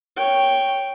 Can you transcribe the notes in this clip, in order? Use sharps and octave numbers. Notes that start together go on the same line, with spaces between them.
C#5 G5